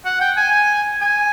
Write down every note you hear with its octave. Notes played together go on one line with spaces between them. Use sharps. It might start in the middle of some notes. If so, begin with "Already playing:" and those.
F#5
G5
G#5
G#5